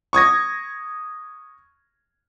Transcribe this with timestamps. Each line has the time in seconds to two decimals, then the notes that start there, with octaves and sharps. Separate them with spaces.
0.13 C#6 D#6 G#6 A#6